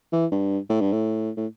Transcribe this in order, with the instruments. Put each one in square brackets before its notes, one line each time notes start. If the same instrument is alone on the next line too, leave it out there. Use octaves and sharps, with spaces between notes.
[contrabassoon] E3
G2
A2
G2
A2
A2